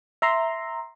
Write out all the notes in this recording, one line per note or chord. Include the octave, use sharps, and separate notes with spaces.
E5 A#5 C6